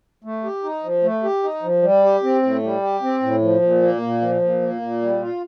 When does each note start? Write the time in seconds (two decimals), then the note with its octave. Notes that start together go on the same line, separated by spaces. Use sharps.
0.24 A3
0.44 G4
0.64 D#4
0.84 F3
1.03 A3
1.23 G4
1.43 D#4
1.63 F3
1.82 G3
2.03 G4
2.23 C4
2.43 A2
2.63 G3
2.82 G4
3.02 C4
3.23 A2
3.42 F3
3.62 A#2
3.82 A#3
4.02 A#2
4.21 F3
4.41 A#2
4.62 A#3
4.82 A#2
5.02 G3
5.22 F4